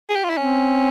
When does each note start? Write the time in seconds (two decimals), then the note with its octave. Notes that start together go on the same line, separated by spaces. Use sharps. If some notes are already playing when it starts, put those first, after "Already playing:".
0.10 G#4
0.16 G4
0.24 F4
0.30 E4
0.37 C4 C#4